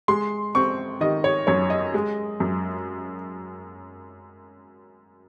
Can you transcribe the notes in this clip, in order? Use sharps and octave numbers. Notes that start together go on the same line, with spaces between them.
G#3 C6
C4 C#6
D#3 D#5
C#5
F#2 C#5
D#5
G#3
F#2